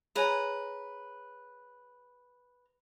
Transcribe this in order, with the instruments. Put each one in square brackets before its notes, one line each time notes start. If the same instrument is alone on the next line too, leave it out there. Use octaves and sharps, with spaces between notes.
[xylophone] G#4 C#5 G#5 [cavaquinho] B4 A#5